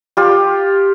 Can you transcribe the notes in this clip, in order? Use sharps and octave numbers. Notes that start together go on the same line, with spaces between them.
F4 G4